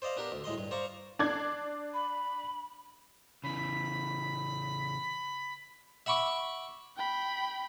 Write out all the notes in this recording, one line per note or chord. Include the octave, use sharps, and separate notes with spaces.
C5 D5 D#5 F5
B3 D4 G4 A#4
D2
A2 G#3 D#5 C6
G2
C5 D5 F5 A#5 C#6
D4 D5 G#6
B5
C#3 E3 B5
E5 F#5 B5 C#6 D6
G5 B5